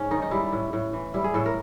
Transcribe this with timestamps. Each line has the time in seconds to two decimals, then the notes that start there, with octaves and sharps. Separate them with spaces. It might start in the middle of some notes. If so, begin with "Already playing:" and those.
Already playing: G#2 C#4
0.11 D#3 D#4
0.22 D#4
0.31 G3 E4
0.52 A2
0.73 A2
0.93 E3
1.14 G3 E4
1.24 G#4
1.34 A2 A4
1.46 A#4